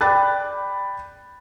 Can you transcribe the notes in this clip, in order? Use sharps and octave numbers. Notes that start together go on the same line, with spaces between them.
D5 G5 B5 D6 F#6 A6